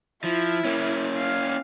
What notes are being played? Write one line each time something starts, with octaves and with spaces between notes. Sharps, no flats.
F3 E4
A#3 C#4
F5